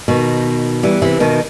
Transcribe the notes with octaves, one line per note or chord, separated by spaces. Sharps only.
B2 D#3
E3 G3
C3 E3
B2 D#3